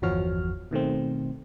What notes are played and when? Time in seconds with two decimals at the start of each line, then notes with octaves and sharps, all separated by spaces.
0.02 G1 E2 F3 F#4 C#5 F6
0.71 B2 D#3 A3 C4